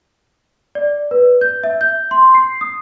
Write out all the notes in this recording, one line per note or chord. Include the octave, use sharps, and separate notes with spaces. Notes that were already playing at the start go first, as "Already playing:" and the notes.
D5
B4
G6
E5
G6
C6
C7
D#6